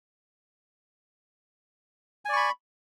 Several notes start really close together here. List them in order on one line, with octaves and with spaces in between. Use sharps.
G#5 D5 C#6 B5